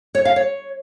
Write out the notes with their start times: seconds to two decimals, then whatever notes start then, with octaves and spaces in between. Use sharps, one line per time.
0.15 C#5
0.25 F5
0.36 C#5